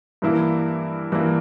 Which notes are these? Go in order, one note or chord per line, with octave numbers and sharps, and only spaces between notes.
G2 E3 A#3 E4
G2 E3 A#3 E4